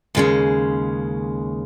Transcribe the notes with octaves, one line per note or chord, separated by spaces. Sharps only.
D#2 C#3 G#3 C#4